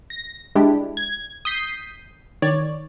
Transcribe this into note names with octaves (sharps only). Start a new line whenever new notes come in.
A#6
G#3 D4 E4 G4
G#6
D#6 G6 B6 C7
D#3 C#5 D5